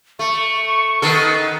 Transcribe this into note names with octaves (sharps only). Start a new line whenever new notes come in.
A3 C#6
D#3 B3 A4